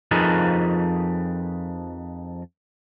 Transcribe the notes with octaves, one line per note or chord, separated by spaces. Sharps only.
F2 F3 D#4 G#4 A#4 B4